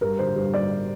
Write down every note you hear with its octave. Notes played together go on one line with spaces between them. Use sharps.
G2 A#4
D3 C5
G2
G2 D5